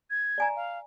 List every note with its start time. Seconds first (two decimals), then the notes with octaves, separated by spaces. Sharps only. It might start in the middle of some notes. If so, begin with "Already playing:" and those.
0.10 G#6
0.38 D5 G#5 A#5
0.56 F5